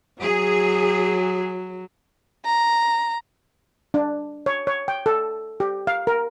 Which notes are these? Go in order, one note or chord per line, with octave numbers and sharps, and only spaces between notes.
F#3 G#4
A#5
D4
C#5
C#5
G5
A4
G4
F5
A#4